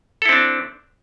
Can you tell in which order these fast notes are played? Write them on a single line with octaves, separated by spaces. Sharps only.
A4 E4 C4 D4